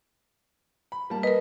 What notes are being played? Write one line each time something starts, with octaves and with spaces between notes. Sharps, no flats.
B5
G3 A#3 A5
A#4 B4 D#5